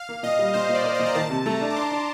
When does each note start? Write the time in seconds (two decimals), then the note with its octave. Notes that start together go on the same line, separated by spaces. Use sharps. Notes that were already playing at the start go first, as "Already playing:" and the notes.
Already playing: F5
0.09 A#3
0.23 A#2 D#5
0.39 G3
0.54 A#2 C5
0.69 A#2
0.74 D5
0.84 A#3
0.95 A#2 D#5
1.06 A#5
1.15 D#3 A5
1.30 C3
1.46 A3 A#5
1.61 D4
1.70 D6
1.76 D4 C6
1.91 D4